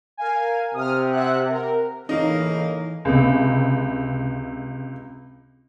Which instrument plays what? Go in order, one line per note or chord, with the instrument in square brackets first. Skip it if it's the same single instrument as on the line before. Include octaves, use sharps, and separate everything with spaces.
[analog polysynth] A#4 F5 G#5
[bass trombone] C3 [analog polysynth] D#6 F6
[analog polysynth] E5 F#5 F#6
A#4
[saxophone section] A2 C#3 A#3 [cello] E3 [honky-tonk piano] D#4
[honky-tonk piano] C#2 C3